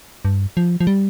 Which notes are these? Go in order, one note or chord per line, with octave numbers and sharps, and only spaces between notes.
G2
F3
F3
G3